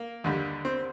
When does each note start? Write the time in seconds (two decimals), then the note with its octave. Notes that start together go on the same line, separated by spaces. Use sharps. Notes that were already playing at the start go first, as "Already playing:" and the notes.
Already playing: A#3
0.24 D#2 D3 G3
0.65 C4